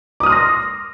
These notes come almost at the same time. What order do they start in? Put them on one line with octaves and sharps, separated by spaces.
D6 D#6 F6 C6 A#6